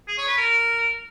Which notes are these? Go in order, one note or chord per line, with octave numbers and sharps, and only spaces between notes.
G#4
C#5
B4
A#4